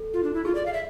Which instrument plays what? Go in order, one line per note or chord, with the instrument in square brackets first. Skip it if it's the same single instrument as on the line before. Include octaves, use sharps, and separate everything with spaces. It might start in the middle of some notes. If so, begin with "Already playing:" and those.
Already playing: [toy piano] A4
[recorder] F4
D4
E4
[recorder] F4 [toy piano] G#4
[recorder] D5
F5
E5